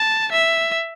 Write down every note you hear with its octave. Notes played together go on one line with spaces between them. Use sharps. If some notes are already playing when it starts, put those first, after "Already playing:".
Already playing: A5
E5